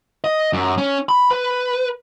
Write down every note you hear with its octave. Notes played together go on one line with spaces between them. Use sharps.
D#5
F#2
C#4
B5
B4